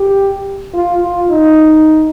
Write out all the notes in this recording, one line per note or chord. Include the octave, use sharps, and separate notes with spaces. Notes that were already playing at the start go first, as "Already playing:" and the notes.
Already playing: G4
F4
F4
D#4